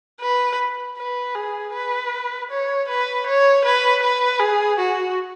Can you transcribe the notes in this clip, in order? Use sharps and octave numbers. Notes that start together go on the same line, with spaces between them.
B4
B4
G#4
B4
C#5
B4
C#5
B4
B4
G#4
F#4